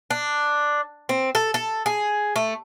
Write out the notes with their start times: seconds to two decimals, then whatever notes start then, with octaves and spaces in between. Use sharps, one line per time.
0.11 D4
1.09 C4
1.35 A4
1.54 A4
1.86 G#4
2.36 A3